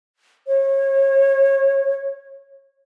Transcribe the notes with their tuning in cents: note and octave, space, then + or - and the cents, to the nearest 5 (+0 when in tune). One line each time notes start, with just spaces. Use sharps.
C#5 -30